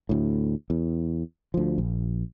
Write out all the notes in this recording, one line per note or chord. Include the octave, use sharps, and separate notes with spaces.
D2 A2
E2
D2 F3
A#1